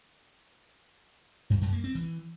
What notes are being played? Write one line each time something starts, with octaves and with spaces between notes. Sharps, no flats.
G2
F#2
A#3
C4
E3